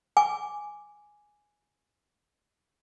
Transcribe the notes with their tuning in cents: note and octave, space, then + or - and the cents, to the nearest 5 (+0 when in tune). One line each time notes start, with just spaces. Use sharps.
G#5 +0 D6 +0